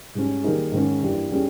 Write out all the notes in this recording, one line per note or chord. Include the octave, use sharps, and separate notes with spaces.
G#2 G3 C#4
D#3 G3 A#3 D#4 G#4
G#2 D#3 G#3 C#4
G2 E3 G3 A#3
G3 C#4 G#4